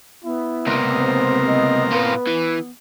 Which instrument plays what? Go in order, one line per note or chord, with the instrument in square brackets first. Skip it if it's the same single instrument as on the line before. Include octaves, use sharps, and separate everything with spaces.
[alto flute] B3 [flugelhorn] E4
[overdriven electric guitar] C#2 C3 [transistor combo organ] A#3 C4 A#4
[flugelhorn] C5
D#5
[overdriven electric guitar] A2 F4 [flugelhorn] B4
[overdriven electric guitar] E3